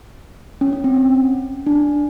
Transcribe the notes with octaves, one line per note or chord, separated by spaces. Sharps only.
C#4
C#4
C4
C#4
D4